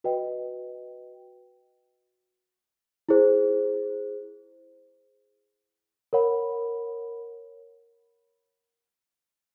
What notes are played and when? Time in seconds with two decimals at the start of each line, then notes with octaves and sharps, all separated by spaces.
0.04 F#4 B4 D#5 G5
3.09 E4 G#4 C5
6.13 A#4 C#5 F#5 B5